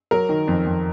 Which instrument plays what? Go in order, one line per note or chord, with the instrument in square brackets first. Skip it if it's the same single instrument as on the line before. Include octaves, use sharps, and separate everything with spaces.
[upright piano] F#3 A#4
D#3
F2
F2